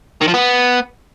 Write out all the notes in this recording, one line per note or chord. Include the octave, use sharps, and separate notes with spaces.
D#3
F3
B3